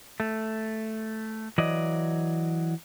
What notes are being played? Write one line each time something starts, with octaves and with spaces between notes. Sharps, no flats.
A3
E3 F#3 D5 D#5